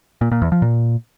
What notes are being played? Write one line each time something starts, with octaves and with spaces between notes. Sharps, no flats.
A#2
A#2
E2
F3
A#2